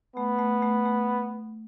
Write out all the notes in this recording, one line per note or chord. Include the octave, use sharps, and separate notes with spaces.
A3 B3
A3
A3
A3